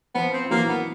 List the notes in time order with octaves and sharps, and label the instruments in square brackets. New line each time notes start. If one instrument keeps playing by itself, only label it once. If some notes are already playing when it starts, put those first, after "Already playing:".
[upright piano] F3 [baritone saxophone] B3
[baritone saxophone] C4
[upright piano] F3
[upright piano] E3 F#3 [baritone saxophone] A#3
[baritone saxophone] B3